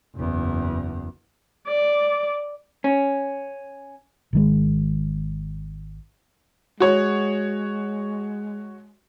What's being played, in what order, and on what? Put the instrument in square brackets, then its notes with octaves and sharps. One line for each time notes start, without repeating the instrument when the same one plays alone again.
[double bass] F#1 E2
[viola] D5
[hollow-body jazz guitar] C#4
[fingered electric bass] G#1 D#3 G#3
[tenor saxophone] G#3 [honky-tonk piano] F#4 C#5